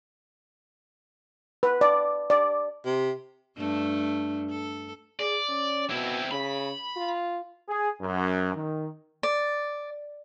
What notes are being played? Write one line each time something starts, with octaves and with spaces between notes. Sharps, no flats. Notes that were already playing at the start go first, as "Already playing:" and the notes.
B4
D5
D5
C3
G2 A3 D4
A4
G#4 D5
C#4
B2 C4 E4
C#3 B5
F4
G#4
F#2
D#3
D5